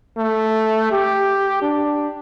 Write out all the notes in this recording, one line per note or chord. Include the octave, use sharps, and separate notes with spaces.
A3
G4
D4